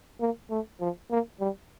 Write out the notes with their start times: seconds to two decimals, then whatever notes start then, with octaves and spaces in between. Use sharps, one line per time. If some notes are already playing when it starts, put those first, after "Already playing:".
0.21 A#3
0.50 A3
0.80 F3
1.11 A#3
1.40 G3